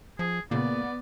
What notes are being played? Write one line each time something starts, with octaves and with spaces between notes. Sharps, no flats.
F3 G#4
A#2 C#3 A#3 B3 D5